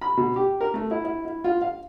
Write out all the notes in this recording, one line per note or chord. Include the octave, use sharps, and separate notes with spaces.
B5
B2
G4
A#4
A3
E4
E4
E4
F4
F5